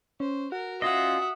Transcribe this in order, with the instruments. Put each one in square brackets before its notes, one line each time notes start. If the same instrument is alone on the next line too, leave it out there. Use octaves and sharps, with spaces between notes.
[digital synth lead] C#4 [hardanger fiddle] C5
[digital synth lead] F#4 [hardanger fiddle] A#4
[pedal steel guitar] C#4 F4 D#5 [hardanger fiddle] E5 F#5 [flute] D#6